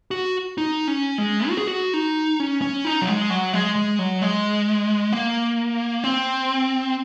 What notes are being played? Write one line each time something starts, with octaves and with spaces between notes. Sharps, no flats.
F#4
D#4
C#4
G#3
F#4
G#4
F#4
D#4
C#4
C#4
D#4
F#3
G#3
F#3
G#3
G#3
F#3
G#3
A#3
C4